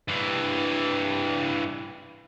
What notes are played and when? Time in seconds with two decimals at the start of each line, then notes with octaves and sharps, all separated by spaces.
0.08 G2 E3